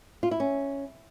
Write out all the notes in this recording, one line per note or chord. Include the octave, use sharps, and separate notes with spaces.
F4
E4
C#4